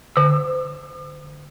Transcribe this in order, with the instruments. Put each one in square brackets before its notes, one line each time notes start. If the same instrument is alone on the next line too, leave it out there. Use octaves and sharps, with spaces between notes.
[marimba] D3 E6